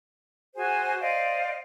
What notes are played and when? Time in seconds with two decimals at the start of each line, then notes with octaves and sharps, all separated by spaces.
0.56 F#4 G#4 C5 G#5
1.00 C5 D5 D#5 F5